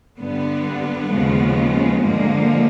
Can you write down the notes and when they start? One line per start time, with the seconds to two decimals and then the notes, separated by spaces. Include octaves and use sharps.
0.19 G2 D3 G3 B3
1.10 D#2 C#3 F3 G#3
2.01 G2 D3 F3 G#3 A#3